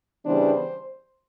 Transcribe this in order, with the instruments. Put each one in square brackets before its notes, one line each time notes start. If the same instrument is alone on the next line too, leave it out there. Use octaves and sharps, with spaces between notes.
[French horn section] C#3 E3 G3 B3 D4 C5